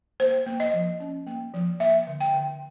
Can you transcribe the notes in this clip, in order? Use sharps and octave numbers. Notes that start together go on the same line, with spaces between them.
A#3 C5
A#3
D#5
F3
C#4
A#3
F3
A#3 E5
D3
G5
D3